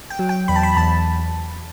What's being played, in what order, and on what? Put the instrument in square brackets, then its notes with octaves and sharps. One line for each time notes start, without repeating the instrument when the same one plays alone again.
[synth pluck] G5
F#3
G5
E2 B5
A5
B5
E2 A5